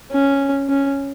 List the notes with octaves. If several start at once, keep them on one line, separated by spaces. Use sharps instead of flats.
C#4
C#4